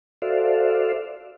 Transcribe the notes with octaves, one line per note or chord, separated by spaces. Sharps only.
F#4 A4 C5 D5 E5 F5